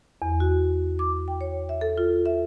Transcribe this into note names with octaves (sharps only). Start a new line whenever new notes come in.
E2
F#4
D6
G5
C#5
E5
A4
F4
E5